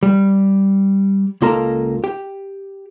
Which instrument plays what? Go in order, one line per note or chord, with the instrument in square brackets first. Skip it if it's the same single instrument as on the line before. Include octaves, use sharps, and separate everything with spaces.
[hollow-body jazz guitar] G3
C#2 A#3 F4 A4 A#4 A#5
G4